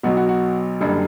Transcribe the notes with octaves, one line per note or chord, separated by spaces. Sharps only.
B1 B2 F#3 F#4
F#4
F#4
F#1 F#2 D3 G3